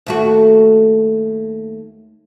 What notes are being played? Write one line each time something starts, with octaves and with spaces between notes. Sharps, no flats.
D#2 A3 F#4